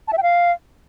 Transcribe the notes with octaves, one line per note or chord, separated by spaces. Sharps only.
A5
E5
G5
F5